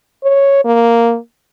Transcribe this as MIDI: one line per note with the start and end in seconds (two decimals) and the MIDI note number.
0.24 0.62 73
0.65 1.17 58